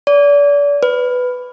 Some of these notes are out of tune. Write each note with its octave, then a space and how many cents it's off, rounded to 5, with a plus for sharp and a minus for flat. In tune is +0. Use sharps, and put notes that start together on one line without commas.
D5 -35
B4 +10